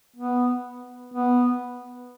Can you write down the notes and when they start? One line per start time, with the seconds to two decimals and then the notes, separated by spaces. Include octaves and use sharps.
0.16 B3
1.14 B3